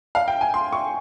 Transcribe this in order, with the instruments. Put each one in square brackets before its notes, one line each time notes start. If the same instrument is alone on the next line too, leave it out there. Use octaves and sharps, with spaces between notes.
[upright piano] F5
G5
G#5
C6
C#6